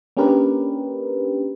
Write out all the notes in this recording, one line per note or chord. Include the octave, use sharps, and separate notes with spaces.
A#3 C#4 D4 G4 A#4 B4